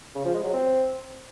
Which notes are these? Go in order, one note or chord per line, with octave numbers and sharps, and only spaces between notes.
C#3
F3
G#3
F#3
C4